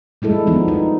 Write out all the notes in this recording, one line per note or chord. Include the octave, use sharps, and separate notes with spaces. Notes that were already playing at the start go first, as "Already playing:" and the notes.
G3 G#3 E4 A4
F3 B3 D#4
D#4